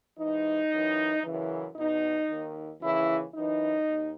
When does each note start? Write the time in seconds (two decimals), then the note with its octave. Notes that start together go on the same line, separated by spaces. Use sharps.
0.18 G#2 E3 D#4
0.71 F#2 E3
1.24 F#2 C#3 E3
1.76 E2 B2 D#4
2.29 D#2 D#3
2.82 D#2 C#3 E3 E4
3.34 F#2 E3 D#4
3.87 D#2